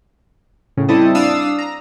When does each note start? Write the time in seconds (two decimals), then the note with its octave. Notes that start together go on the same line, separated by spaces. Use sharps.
0.77 A2 C#3
0.88 G3 C4 E4 A4 D#5
1.15 D4 F5 D#6 E6
1.58 A#5